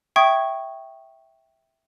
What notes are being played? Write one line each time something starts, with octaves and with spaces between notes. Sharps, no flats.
E5 G5 C#6 D#6 G#6